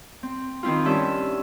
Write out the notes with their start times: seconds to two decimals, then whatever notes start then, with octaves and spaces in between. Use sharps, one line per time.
0.23 C4
0.63 D#3 C4 E4 F4
0.85 G2 C#4 E5